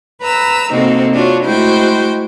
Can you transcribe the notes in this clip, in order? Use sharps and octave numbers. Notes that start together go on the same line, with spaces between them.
B4 A#5 E6
C3 A#3 C4 D#4 F#4 A4
D4 F4 F#4 C#5
G#3 A3 E4 F#4 C5 G5